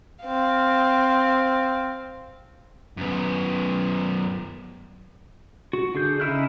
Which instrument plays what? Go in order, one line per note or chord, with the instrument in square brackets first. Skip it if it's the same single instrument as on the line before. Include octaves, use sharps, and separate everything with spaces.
[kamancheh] C4 F5
[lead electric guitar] F#2 B3
[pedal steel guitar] F#4
D3 G#4 G6
C#3 D#4 E4 F6 F#6